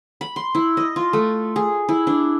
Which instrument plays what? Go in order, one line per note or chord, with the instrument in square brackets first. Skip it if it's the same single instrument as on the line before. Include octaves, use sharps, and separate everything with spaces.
[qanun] B5
C6
E4
D#5
F4
A3
G#4
E4
D4